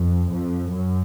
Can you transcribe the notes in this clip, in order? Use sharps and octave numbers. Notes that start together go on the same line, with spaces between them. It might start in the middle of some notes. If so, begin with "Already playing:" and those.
Already playing: F2
F2
F#2